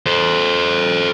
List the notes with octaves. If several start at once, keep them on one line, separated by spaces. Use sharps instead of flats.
A4 C5